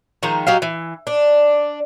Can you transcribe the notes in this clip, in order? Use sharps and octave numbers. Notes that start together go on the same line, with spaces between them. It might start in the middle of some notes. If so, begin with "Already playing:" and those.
D#3 F3 G#3 A#5
F#3 G4 D#5 F5
E3
D4